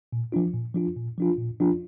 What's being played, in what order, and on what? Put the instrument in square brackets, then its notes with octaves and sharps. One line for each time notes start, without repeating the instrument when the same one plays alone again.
[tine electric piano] A#2
F3 D4 F4
A#2
F3 D4 F4
A#2
F3 D4 F4
A#2
F3 D4 F4